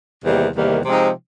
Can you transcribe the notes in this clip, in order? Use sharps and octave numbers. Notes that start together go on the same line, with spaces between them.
E2 C3 D#3 G3 A#3
E2 C3 D#3 G3 A#3
C3 F3 G#3 C4 D#4